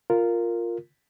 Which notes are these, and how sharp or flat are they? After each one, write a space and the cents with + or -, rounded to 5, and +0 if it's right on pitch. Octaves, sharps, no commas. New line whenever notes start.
F4 +0 A#4 -10